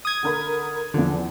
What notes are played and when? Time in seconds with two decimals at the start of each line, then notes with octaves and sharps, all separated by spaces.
0.05 D#6 G#6
0.23 D3 A#4 B5
0.94 E2 D3 F3